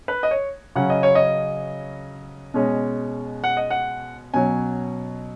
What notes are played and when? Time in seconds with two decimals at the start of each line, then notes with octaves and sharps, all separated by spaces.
0.08 B4
0.23 D#5
0.31 C#5
0.76 C#3 F#3 C#4 F#5
0.90 D#5
1.03 C#5
1.15 D#5
2.54 B2 G#3 C#4
3.44 F#5
3.57 D#5
3.71 F#5
4.34 B2 F#3 C#4 G#5